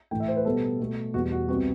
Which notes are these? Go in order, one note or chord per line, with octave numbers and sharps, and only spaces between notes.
A2 E3 A3 G5
E5
C5
B4
B2 G3 B3 A4
B2 A3
E2 B2 G3 F#4
F#4
C2 C3 G3 B3 F#4